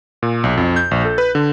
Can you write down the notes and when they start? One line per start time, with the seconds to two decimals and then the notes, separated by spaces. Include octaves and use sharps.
0.23 A#2
0.44 B1
0.58 F2
0.76 G6
0.91 A#1
1.05 A4
1.18 B4
1.35 D3